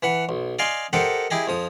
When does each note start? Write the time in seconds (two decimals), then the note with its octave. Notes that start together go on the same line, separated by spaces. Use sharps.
0.03 E3 B4 F#5
0.29 B1
0.59 D5 D#5 F5 G#5 C6
0.93 G4 A4 A#4 C5 D#5 F#5
1.30 E4 G4 G#4 D#5
1.48 F2 F3 D#6